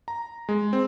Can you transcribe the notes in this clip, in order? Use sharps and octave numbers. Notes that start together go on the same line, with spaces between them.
A#5
G#3
C4